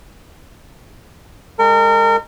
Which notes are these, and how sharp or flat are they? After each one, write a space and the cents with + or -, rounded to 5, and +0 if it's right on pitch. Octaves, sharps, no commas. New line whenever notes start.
G#3 -25 A#4 -35